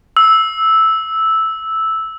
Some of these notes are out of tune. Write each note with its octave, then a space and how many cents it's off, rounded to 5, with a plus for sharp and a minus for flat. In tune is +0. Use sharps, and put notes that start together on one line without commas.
E6 -10